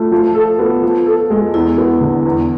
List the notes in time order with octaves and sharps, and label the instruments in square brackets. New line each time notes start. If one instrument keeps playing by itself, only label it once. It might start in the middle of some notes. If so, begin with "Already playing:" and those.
Already playing: [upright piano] A3 [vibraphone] F4
[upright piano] F3
A4
B3
F3
A4
G#3
[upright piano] E2 [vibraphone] E4
[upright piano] B3
D3
E2